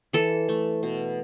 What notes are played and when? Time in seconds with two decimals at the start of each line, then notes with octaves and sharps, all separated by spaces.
0.13 E3 A4
0.49 A3
0.83 B2